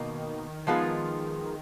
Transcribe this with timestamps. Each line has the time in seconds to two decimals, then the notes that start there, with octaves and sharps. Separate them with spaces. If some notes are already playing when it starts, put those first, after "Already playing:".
Already playing: B2 D#3 A#3 D#4
0.67 F3 G#3 B3 F4 G#4